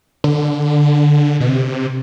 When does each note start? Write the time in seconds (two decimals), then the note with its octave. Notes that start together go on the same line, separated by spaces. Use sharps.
0.24 D3
1.40 B2
1.49 C3